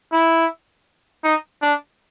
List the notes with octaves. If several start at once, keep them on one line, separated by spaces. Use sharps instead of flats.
E4
D#4
D4